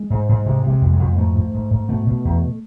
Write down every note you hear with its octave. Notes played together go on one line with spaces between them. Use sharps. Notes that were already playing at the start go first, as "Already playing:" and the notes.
Already playing: G#3
G#2
G#2
C3 G#3
C3
G#3
F2
G#3
F2
G#3
G#2 A3
G#2
G#2
G#2
B2 A3
B2
E2